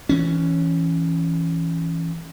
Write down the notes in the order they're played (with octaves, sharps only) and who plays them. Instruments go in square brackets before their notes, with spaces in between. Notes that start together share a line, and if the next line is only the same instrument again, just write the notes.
[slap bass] E3 C#4